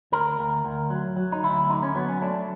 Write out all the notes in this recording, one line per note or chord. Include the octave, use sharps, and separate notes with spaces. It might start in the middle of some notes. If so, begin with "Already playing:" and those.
D2 A#4
D2
D2
F#3
F#3
D#4
D2 E4
D3 D#4
C#4
F#3 B3
C#4
A3 D4